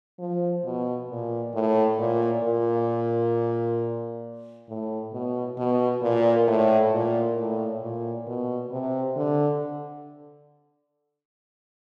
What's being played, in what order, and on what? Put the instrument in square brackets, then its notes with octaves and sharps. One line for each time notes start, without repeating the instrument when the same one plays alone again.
[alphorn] F3
B2
A#2
A2
A#2
A#2
A2
B2
B2
A#2
A2
A#2
A2
A#2
B2
C3
D3